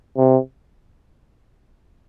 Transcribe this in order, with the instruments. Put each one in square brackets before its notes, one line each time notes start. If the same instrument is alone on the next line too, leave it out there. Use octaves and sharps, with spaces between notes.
[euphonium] C3